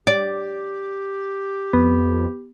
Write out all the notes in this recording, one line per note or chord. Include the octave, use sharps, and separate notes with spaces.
G4 D5
F2 B3